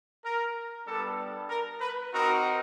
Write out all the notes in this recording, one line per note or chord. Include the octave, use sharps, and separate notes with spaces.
A#4
G3 B3 D4 A4
A#4
B4
C4 D#4 F#4 A#4